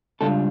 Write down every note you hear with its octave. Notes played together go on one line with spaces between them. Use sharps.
C#2 C#3 G3 D4 F4 A4